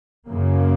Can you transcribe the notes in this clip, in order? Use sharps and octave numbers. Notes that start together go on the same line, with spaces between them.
F#2 C#3 A#3